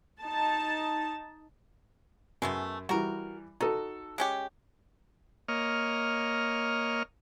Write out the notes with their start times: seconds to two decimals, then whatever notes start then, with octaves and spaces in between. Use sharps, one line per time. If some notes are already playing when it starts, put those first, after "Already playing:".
0.21 D#4 A5
2.42 F#2 G#3 A3 B3
2.89 E3 G3 F#4 A#4
3.61 D#4 F#4 A4
4.18 G#3 C#4 G4
5.48 A#3 C#5 D#5 F6